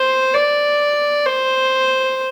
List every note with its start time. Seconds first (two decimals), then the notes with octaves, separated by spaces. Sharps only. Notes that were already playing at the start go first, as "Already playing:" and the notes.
Already playing: C5
0.34 D5
1.26 C5